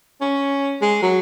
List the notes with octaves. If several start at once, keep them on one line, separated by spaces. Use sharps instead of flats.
C#4
G#3
F#3